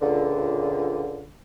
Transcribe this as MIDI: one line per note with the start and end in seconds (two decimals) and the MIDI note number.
0.02 1.27 37
0.02 1.27 46
0.02 1.27 50